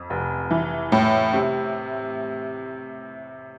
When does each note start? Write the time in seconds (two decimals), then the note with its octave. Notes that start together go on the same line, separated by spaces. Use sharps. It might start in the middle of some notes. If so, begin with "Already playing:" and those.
Already playing: F2
0.10 F1
0.51 E3
0.92 A2
1.33 C3